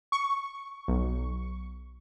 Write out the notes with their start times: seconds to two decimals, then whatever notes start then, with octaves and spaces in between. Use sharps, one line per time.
0.12 C#6
0.88 B1